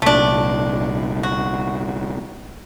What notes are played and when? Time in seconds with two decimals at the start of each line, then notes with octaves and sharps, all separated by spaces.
0.02 C2 A#2 A3 D4
1.23 F#4